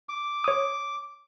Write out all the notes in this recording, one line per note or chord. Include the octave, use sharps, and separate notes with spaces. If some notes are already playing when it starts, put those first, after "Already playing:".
D6
C#5 D#6